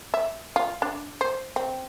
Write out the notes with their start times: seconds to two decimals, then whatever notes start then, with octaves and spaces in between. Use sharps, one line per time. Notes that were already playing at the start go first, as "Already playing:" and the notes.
0.14 E5
0.56 F4
0.82 D4
1.21 C5
1.56 C4